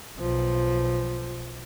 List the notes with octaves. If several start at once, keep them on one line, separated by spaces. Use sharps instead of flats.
B1 F3